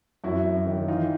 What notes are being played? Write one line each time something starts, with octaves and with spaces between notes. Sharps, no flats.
F#2 E4 F#4
F#2
D#3
E3 D#4 F4